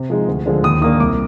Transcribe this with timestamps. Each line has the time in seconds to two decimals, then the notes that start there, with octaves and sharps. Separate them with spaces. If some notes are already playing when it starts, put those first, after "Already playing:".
Already playing: C3
0.10 F3 G#3 D#4
0.28 D2
0.46 D3 F3 G#3 D4
0.63 D#2 D#6
0.81 D#3 A#3 D4 D#6
1.00 C2 D6